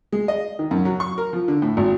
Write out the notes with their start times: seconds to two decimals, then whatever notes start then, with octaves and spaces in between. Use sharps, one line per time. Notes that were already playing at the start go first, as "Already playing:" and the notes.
0.13 G#3
0.28 D#5
0.59 D#3
0.71 F#2
0.85 F#3
1.00 C#6
1.18 A#4
1.33 F3
1.48 D3
1.62 A2
1.77 G#1